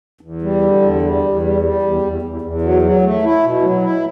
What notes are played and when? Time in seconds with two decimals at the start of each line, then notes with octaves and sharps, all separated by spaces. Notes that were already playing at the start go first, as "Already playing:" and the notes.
0.21 E2
0.42 G3
0.62 D3
0.82 E2
1.02 G3
1.22 E2
1.42 G3
1.62 G3
1.82 E2
2.02 E2
2.22 E2
2.42 E2
2.61 F#3
2.82 F#3
3.02 A3
3.22 E4
3.43 B2
3.62 F#3
3.82 E4